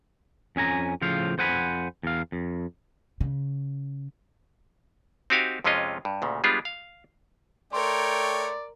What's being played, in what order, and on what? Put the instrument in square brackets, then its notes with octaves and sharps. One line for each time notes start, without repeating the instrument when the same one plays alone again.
[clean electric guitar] F2 C#4 G#5 A#5
A2 C#3 F3 C5 F5
F2 C5 F#5 G#5 B5
E2 F5
F2
[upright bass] C#3
[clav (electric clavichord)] C4 D#4 F#4 G4 F5 G#5
F2 C3 G#3 C#4 F4 D#5
G2
D2 A#2 C#3
G3 G#3 B3 D4 F4 G#4
F5
[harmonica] A3 C#5 G5 [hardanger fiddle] A#4 [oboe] D5 [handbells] C6